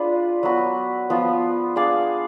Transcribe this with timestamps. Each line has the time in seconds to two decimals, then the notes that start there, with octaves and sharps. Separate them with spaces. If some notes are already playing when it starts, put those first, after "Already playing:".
Already playing: D4 F4 G#4 B4
0.43 F#3 B3 F#4 B4
1.10 F3 B3 F4
1.76 D4 G#4 D5 F5